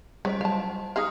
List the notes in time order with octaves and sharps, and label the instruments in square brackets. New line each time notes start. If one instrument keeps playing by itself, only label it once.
[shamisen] C#3 [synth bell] G3 C5 D#5
[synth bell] F#3 [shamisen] F5 A5
[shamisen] D#4 G#4 F5 [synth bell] D#6 F6